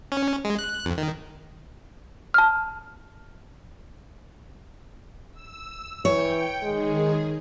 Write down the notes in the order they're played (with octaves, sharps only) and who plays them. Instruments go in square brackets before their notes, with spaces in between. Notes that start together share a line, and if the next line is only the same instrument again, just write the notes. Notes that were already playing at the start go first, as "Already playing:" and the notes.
[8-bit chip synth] C#4
G#3
F#6
F2
D#3
[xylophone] A5 F6
[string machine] E6
[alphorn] E3 [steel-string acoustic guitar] C#5 [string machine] G5
[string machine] D#3 G#4 [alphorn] G#3